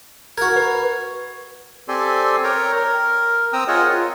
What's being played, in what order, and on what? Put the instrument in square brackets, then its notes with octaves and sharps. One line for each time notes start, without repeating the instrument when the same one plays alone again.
[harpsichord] F#4 A#4 [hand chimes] G#6
[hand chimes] B4
[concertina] C4 G4 A4 D5 G#5 C6
A#4 C#5 G5 A#5
A#4
C4 G5 A#5 D#6 E6
F4 G#4 A#4 C#5 D#5 F#5
F4